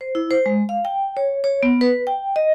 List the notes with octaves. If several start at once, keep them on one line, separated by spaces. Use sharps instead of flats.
C5
E4
C5
G#3
F5
G5
C#5
C#5
B3
B4
G5
D#5